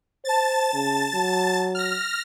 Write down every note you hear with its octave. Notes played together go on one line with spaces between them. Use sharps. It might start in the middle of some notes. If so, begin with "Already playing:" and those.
C5 A5 A6
C#3
F#3
F6 A#6